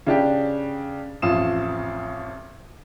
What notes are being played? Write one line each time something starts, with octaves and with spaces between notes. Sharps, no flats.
C#3 D4 G4
A1 F2 F4 D#6 E7